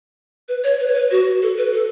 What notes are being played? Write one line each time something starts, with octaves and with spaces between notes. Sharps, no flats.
B4
C#5
B4
C#5
B4
F#4
A4
B4
A4